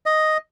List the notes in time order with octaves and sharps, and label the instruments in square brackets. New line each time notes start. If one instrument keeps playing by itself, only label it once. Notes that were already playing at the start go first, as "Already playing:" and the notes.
[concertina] D#5